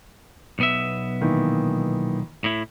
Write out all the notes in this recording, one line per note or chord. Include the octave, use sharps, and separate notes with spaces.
B1 B3 E5
A#2 D#3 E3
A2 E4